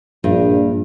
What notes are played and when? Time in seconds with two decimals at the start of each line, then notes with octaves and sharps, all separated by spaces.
0.24 A#1 G2